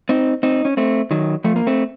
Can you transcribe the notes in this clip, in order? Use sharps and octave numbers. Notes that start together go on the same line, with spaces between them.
C4 D#4
C4 D#4
C#4
A3 C4
D#3 F#3
F3 A3
A#3
A3 C4